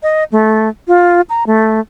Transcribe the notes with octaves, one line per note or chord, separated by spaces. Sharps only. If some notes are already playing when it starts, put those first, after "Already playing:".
D#5
A3
F4
A#5
A3